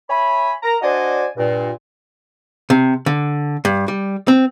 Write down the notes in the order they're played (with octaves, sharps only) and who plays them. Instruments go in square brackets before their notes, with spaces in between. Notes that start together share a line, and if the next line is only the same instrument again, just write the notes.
[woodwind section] C#5 E5 G#5 B5
A#4 A#5
D4 F#4 C5 D5 D#5 G#5
G2 A#2
[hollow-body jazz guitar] C3
D3
G2
G3
C4